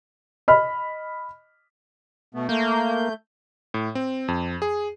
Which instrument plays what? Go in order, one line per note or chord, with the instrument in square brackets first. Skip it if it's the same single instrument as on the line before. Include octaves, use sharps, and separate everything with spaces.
[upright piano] D#5 B5 F6
[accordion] B2 A3 B3
[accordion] A3 G6 [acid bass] A#3
[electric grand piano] A2
C4
F2
G#4